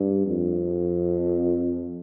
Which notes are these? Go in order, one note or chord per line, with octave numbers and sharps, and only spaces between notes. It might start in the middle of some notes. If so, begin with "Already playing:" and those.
Already playing: G2
F2